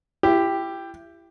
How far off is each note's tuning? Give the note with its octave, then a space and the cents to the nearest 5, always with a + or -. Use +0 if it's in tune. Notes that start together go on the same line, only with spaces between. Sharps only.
E4 +30 G4 +5